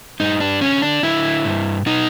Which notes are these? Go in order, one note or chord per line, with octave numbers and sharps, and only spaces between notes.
G2 D#4
D4
D3 C#4
D4
D3 E4
G2
B2 D#4